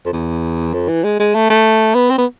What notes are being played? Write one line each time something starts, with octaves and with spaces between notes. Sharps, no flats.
F2
E2
F2
E3
G#3
G#3
A3
A3
B3
C4
B3